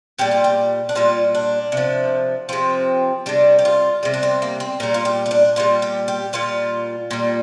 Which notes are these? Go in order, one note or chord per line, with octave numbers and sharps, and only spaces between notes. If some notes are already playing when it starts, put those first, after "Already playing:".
A#2 G3 G4
F4
G4
D4
A#2 G3 F4
D4
C3 F3
C3 F3 C4
C3 G3 D4
G4
F4
C3 G3
D4
C4
A#3
C4
A#2 G3 A#4
F4
G4
F4
D4
A#2 G3 F4
G4
G4
A#2 G3 F4
A#2 G3